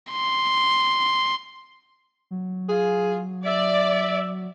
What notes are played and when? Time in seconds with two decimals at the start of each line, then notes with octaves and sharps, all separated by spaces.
0.12 C6
2.31 F#3
2.70 F4 G#4
3.46 D5 E5